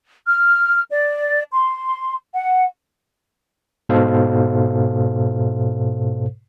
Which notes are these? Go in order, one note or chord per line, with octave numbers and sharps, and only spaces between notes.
F6
D5
C6
F#5
G#2 B2 A4 C5 F5